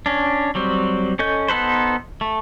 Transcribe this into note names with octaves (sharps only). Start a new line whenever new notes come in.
C#4 D4
F#3 G3 C4
C#4 A4 D#5 G6
B3 D#4 A4 B4 C5
A3